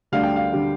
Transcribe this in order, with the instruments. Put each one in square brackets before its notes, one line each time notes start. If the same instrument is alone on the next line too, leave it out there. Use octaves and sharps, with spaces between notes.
[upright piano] D2 D3 G3 D4 F5
G5
F5
D3 G3 D4